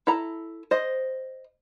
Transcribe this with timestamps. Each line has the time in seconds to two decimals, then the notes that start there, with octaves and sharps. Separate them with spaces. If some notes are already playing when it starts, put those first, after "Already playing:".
0.07 E4 A4 A#5
0.71 C5 D#5